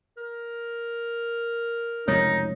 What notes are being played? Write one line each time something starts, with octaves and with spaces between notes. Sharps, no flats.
A#4
F1 C#2 F#2 D#4 C#5